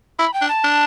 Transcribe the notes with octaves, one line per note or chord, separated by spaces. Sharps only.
E4 B5
G5
D4
A5
D4